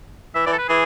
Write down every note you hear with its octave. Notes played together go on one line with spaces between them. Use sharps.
E3 E5
E3 D5
A4
B4
E3 G#4